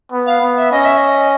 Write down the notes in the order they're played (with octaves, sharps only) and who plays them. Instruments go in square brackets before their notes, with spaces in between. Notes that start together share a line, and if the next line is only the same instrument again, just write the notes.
[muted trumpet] B3
[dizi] F5
[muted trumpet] B3
[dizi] E5
[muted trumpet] C#4 [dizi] D#5
[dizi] E5
D#5